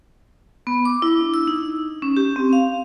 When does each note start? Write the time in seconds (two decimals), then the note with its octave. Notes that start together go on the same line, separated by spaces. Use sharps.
0.67 B3
0.85 D6
1.02 E4
1.21 D4
1.34 E6
1.47 D#4
2.02 C#4
2.17 G4
2.36 C4
2.53 F5